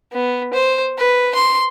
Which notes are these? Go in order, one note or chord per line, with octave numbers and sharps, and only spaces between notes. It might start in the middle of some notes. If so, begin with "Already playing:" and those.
B3
C5
B4
C6